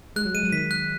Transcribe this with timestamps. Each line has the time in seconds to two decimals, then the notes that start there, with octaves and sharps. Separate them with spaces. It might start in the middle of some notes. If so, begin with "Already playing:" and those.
0.16 G#3 F#6
0.25 F#3
0.34 G#3 D#7
0.43 F#3
0.52 D#3 B6
0.71 F#6